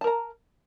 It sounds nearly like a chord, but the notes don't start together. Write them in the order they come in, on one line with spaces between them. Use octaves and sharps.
A5 A#4 A#5